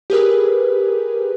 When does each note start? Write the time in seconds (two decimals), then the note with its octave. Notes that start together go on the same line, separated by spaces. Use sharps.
0.10 G4 G#4 A#4 B4